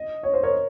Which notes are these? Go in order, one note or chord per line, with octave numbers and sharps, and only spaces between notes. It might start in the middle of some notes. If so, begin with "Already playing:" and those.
Already playing: D#5
C#5
C5
A#4 C#5